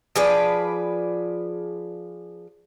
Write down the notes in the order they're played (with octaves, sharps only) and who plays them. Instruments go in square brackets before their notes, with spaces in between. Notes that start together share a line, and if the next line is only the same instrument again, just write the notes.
[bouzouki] F3 G#4 B4 D5